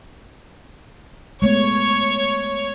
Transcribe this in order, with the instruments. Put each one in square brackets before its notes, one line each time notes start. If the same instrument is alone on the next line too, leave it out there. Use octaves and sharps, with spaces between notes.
[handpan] G#3 A3 B3 [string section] C#5 [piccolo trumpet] C#6